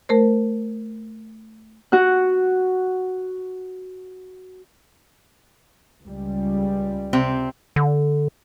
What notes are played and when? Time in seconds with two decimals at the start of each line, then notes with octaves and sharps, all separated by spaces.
0.09 A3 A#4 C5
1.92 F#4 F#5 F#6
6.04 C#2 G3
7.13 C3 C4
7.76 D3